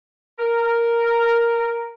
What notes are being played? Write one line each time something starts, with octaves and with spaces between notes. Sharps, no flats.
A#4